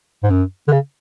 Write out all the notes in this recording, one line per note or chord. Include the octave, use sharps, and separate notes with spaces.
G#2
F#2
D3
C#3